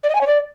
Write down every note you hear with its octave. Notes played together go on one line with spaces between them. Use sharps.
D5
D#5
G#5
C#5
D5